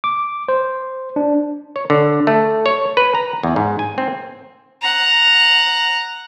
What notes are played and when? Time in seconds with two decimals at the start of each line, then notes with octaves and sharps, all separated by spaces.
0.04 D6
0.49 C5
1.16 D4
1.76 C#5
1.90 D3
2.27 A3
2.66 C#5
2.97 B4
3.15 A#5
3.43 E2
3.56 G#2
3.79 G#5
3.98 C4
4.82 F#5 A#5